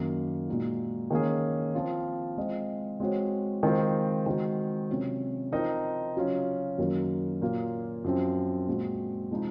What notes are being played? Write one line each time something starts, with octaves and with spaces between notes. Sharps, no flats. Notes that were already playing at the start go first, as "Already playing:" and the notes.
Already playing: F#2 D#3 A#3
A#2 G#3 D#4 F#4
D#3 A#3 C#4 G#4
F3 C4 F4
G#3 C4 F4 C5 D#5
G#3 C4 F#4 C#5
D#3 G#3 C4 F4 C5
D#3 G#3 C4 F#4 A#4
C3 F#3 C#4 F4
F3 C4 D#4 A#4 D#5
C#3 F#3 C#4 F4
F#2 D#3 F#3 A#3
A#2 F#3 A#3 F4
F#2 F3 C4
A#2 G#3 C4 F#4
C3 F3 G#3 D#4